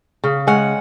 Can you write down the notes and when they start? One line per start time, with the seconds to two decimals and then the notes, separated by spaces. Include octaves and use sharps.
0.24 C#3
0.47 G#3 C#4 F#5